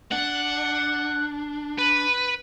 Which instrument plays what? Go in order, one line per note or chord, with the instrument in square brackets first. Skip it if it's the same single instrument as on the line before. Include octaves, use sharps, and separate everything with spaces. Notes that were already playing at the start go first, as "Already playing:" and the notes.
[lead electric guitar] D4 [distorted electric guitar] F#5
[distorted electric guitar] B4